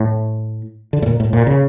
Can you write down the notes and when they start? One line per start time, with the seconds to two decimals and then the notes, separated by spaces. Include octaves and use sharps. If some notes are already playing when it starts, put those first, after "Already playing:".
Already playing: A2
0.93 D3
1.02 A2
1.06 A#2
1.20 A2
1.33 A#2
1.47 C#3